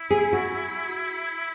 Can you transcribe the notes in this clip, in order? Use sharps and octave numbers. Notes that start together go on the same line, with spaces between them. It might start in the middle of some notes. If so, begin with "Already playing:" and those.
Already playing: E4
G#4
F#4